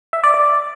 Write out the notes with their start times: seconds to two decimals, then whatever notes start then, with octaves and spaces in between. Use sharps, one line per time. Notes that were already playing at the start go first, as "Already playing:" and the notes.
0.13 E5
0.24 D5
0.34 D5